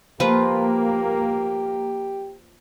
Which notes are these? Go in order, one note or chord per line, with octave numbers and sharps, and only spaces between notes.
F3 A#3 F4 G4 B4